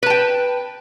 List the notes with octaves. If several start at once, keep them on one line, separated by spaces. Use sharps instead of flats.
B4 G5 A5